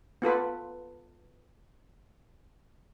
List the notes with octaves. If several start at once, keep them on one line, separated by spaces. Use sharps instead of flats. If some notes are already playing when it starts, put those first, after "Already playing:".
B3 F4 A4 B4